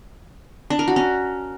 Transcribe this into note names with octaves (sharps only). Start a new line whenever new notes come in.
D4
A#4
F#4
C#4